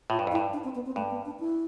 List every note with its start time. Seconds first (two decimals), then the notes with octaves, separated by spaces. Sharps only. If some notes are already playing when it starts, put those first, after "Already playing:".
0.10 A2 F4
0.19 G2
0.27 F2
0.32 E4
0.35 G2
0.53 D4
0.64 C4
0.75 B3
0.86 C4
0.96 G2 A3
1.11 B3
1.25 D4
1.40 E4